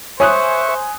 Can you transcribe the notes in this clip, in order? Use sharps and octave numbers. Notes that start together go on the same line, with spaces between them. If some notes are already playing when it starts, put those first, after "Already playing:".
C5 C#5 E5 G#5 C#6 D#6 F#6